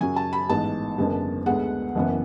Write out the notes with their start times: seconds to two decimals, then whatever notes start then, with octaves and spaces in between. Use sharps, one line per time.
0.01 F#2 C#3 F#3 G#5
0.16 A5
0.33 B5
0.49 A1 G#2 G#3 B3 A5
0.98 F#1 F#2 D3 G#3 B3
1.46 D2 D3 G#3 B3 F#5
1.95 F#1 F#2 E3 B3